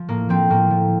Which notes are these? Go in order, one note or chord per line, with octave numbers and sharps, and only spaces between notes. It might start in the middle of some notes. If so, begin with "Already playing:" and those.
Already playing: F3
A2 A#3
F3 C4
A2 A#3
F3